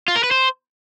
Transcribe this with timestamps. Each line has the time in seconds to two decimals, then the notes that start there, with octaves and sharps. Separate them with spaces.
0.08 F4
0.16 A#4
0.23 B4
0.31 C5